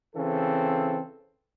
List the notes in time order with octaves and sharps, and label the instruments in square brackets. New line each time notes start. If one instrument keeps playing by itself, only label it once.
[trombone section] C#3 E3 C4 A4